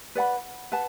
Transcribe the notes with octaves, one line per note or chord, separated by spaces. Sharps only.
B4 D5 F#5 B5
B4 F#5 A5